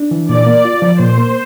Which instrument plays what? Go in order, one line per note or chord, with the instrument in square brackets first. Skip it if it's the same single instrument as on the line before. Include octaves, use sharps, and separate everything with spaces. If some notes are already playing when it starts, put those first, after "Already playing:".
Already playing: [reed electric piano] D4
E3
[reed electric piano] A#2 [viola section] D5
[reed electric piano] A#3
F4
F3
[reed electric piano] A#2 [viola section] C5
[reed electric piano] A#3